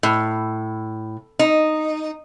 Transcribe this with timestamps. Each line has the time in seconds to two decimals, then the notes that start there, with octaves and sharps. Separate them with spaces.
0.03 A2
1.39 D#4